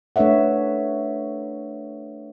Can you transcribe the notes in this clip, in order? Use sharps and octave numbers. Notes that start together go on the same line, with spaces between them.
A3 D4 B4 C#5 E5 F#5